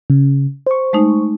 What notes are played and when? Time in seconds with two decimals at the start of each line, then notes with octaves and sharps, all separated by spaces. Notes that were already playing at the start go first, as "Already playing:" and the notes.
0.10 C#3
0.67 C5 C#6
0.93 G#3 A3 D#4